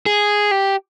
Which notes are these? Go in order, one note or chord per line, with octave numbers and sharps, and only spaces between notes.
G#4
G4